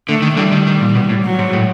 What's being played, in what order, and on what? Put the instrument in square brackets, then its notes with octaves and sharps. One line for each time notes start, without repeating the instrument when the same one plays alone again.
[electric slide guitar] D3 [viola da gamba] A3
[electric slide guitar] D#3
[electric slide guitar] D3 E3 [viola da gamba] G3
[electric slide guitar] D#3
D#3
A#2
B2
A2
[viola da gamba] F#3
[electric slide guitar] G#2
A2